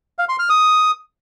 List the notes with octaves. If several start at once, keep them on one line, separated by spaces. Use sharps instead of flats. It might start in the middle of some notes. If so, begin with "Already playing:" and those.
F5
C6
F6
D#6